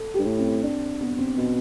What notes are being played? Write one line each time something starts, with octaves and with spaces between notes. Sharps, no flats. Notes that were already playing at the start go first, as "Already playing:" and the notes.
Already playing: A4
G2 G4
A2
C4
D4
B3
C4
B2